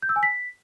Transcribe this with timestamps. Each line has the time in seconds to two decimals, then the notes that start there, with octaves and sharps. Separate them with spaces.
0.02 G6
0.09 E6
0.16 G#5
0.23 B6